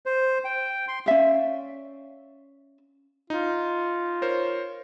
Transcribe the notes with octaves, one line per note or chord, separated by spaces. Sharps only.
C5
G5
C6
C#4 D5 E5 F5
D#4 F4
A#4 C5 C#5